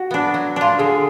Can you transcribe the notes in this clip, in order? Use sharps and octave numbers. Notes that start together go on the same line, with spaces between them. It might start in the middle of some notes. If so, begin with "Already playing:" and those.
Already playing: F#4
B3 D4
F#3
D4 F4
D3 G#4